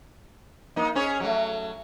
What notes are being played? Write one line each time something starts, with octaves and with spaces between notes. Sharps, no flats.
A#3 D#4
C#4 G#4 C#5
F#3 A3